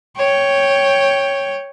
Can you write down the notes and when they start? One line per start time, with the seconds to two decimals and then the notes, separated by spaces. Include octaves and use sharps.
0.17 C#5 G5